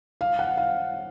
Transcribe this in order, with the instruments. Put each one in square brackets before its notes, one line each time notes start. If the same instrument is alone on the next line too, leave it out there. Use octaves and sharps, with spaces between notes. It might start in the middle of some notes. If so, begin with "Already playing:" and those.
[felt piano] F5
F#5
F5